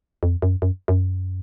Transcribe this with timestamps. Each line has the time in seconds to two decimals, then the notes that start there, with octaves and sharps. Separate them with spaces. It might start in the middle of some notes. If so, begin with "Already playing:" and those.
0.23 F2
0.42 F#2
0.62 F#2
0.88 F#2